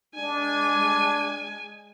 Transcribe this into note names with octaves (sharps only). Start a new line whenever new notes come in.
G#3 D4 G#5